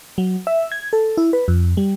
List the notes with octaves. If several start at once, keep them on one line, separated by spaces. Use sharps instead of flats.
F#3
E5
G#6
A4
E4
B4
F2
G3